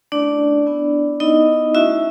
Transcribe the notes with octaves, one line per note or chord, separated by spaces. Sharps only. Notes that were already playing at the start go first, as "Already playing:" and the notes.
A3 C#4 D4 E4 D5
B3 E4
B3 D#4 E4 D#5
A3 C#4 E4 F#4 E5